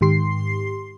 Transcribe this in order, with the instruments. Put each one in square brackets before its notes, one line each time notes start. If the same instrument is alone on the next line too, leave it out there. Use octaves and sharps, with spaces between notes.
[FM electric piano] G#2 D#3 G4 C6 C7